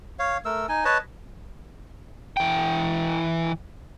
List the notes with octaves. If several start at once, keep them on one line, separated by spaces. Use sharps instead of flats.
C#5 F5
A3 A#4 E6
D#4 G#5
B4 C#5 D#5 A5
E3 G5